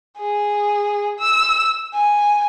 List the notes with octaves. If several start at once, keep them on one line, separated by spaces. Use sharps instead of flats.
G#4
E6
G#5